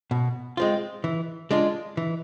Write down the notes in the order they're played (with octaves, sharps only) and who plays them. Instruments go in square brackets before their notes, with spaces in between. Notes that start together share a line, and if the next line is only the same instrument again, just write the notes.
[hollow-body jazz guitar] B2
G#3 C4 F4
E3
G#3 D4 F4
E3